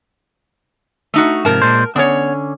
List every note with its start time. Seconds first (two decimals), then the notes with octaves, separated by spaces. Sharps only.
1.14 A3 D#4 F#4
1.45 G#2 C3 F3 A#4 A5
1.62 A#2 G#3 C5
1.96 D3 B3 C#4 C#5